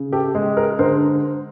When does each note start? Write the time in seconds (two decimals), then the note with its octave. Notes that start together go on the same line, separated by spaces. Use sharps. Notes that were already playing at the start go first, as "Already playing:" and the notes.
Already playing: C#3
0.12 G4 A4
0.34 G#3 G#4
0.57 G#4 A#4
0.79 D3 A#4 C5